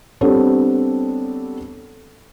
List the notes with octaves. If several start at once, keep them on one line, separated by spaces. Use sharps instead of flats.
G3 B3 C4 D4 A4 C#5